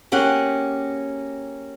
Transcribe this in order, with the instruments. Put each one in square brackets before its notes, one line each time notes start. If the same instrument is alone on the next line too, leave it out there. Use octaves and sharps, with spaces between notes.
[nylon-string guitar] A#3 C#4 G4 G#4 F#5